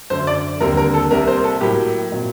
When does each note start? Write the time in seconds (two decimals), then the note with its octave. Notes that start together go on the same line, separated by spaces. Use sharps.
0.10 F#2 D3 A3 C5
0.27 D5
0.60 D#2 D3 G3 C4 A#4
0.77 A#4
0.94 A4
1.11 C2 C3 G3 A#3 A#4
1.28 C5
1.44 A4
1.61 A2 F#3 A#3 G4
2.12 A#2 F#3 C4